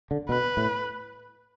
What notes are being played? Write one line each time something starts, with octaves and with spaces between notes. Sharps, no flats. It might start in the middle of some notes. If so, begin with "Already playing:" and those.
D3
B2 B4
A2